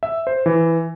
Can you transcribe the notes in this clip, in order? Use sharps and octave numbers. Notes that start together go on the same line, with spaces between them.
E5
C5
E3